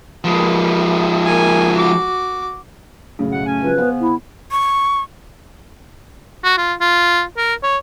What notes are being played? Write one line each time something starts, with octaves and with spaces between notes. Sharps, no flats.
F3 G#3 A#3 B4
A#3 G#5
F#4 D6
F#2 A2 C#3
B2 A3 F#5
A3 C#4 G#5
C#3 F3 F#3 B4
C#3 B3 C5 F5 G#5
E4
C#6
F#4
F4
F4
A#4
C#5